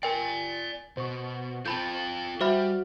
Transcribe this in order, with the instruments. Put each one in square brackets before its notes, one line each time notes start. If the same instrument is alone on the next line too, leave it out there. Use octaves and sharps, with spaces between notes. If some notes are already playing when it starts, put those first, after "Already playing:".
[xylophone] A#4 G5 [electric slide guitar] D5 G#5
[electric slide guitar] B2 [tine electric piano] C5 C#6
[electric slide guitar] F4 A4 [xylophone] A5 B5 G6
[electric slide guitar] G3 [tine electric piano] F#4 F6 [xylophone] C5 E5 B5